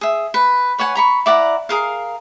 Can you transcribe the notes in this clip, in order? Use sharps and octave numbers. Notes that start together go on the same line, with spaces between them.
G#4 E5
B4
B4 C#5 F#5 G#5
A#5 B5 C#6
E4 D5 F#5 A#5
G#4 A#4 F5